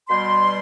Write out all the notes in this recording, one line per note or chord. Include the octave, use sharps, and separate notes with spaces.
B2 G3 C6